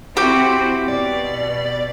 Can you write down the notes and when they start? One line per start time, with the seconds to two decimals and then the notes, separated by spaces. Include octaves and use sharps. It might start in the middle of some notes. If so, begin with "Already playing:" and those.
0.17 C4 E4 F#4 G4
0.88 B2 D5